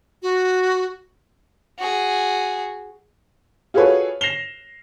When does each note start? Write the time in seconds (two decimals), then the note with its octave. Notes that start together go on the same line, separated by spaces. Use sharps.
0.22 F#4
1.79 F#4 G#4
3.74 F4 F#4 G#4 A4 B4 C#5
4.21 A#6 C7 E7 F7 G7